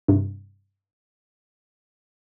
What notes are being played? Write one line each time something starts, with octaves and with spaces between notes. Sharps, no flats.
G2 C3